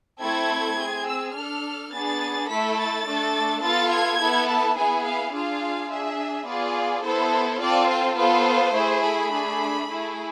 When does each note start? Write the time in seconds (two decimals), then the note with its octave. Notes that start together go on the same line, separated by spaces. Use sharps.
0.21 A3 C4 E4 A4 G#6
0.77 C4 G#4
1.06 E6
1.34 D4 A4 F6
1.91 B3 D4 G#4 A6
2.48 A3 E4 A4 B6
2.77 A6
3.05 A3 D4 A4
3.62 B3 F4 A4 A6
3.90 G#6
4.18 B3 E4 A4
4.47 A5
4.75 B3 E4 G#4 G#5
5.04 F5
5.32 D4 F4 G#4 F5
5.90 D4 G#4 E5
6.46 B3 F4 G#4 D5
7.03 B3 E4 A4 C5
7.60 C4 F4 A4 D5
7.88 C5
8.17 B3 F4 A4 C5
8.73 A3 E4 G#4
9.03 B5
9.31 A3 D4 G#4
9.87 A3 E4 G#4